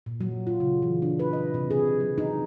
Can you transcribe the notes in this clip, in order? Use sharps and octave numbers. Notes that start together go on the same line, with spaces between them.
A#2
F#3
F4
C#3
E3
D4
B4
D#5
C3
G#4
F#3
D#4